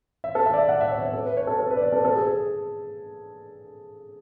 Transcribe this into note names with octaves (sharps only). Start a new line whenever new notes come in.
E5
A4
E5
D5
E5
F#5
E5
C#5
C#5
A4
B4
C#5
B4
A4
A4
B4
D5
C#5
A4
A4
G#4
A4